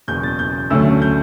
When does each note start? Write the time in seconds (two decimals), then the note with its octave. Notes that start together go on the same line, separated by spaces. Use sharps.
0.08 F#1 E2 B2 G6
0.23 A6
0.39 G6
0.70 D2 D3 F#3 A3 C#4 E6
1.02 G6